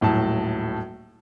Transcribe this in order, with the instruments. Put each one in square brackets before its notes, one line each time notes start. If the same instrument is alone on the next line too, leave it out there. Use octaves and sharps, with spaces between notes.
[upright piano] D#1 A2 F#3 A5